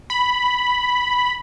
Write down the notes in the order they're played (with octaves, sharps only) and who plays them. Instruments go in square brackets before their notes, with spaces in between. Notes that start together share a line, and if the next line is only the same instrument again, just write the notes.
[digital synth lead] B5